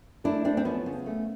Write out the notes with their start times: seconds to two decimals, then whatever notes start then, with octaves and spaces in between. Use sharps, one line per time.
0.24 A3 D4 E4
0.44 A3 C4 D4
0.57 C4
0.65 F3 B3 C#4
0.86 C#3
1.06 A3